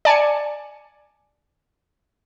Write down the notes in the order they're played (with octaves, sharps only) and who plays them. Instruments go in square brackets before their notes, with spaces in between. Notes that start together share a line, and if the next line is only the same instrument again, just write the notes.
[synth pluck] D5 G#5 A5 C#7